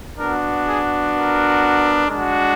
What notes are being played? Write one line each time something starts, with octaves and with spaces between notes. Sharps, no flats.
B3 D4 F#4 A#4
G#4
A#4
G#3 D4 F#4